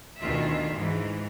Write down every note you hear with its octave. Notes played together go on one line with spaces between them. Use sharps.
D2 B2 D#3 F4 E5
G#2 E3